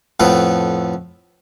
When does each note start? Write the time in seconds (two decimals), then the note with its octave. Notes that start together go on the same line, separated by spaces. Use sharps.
0.20 F2 A2 A3 B3